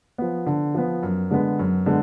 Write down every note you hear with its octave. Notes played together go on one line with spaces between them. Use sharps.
F3 B3
D3
F3 B3
F#2
D3 G#3 B3
F#2
D3 G#3 B3